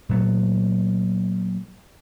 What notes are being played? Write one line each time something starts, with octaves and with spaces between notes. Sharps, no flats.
A#2 F#3 A3